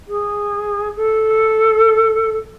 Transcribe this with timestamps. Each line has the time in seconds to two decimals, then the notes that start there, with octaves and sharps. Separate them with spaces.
0.07 G#4
0.96 A4